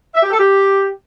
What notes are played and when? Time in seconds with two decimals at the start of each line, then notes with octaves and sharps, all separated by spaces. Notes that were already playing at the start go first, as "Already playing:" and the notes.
0.14 E5
0.22 G4
0.30 A4
0.38 G4